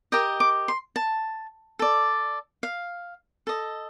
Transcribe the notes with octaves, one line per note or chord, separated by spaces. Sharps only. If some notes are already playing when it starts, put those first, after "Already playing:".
G4 A#4 D#5 G5
D6
C6
A5
A4 D5
F5
A4 D#5